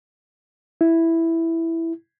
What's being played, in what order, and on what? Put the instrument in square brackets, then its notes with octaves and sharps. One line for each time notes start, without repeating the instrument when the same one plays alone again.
[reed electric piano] E4